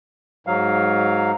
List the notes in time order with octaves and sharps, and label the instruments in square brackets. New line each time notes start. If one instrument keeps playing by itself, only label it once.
[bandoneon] G#2 F#3 F5